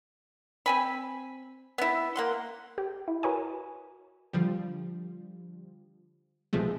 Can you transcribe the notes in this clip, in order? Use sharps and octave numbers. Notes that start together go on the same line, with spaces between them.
C4 G#5 B5
B3 E4
A#3 F#5 C6
G4
E4
F#4 A#4 B4 C#5 D#5 G#5
D3 F3 G3
C2 B2 F3 G#3 A3